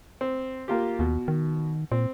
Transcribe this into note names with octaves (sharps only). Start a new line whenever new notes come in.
C4
A#3 F4 G4
D#2 B2
D#3
A#2 C4